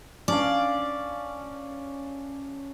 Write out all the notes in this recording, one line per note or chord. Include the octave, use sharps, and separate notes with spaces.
C#4 D4 D5 F5